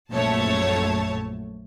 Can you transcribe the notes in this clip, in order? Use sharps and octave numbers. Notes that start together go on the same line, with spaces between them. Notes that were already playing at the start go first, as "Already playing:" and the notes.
A#1 F#2 A3 C#5 A5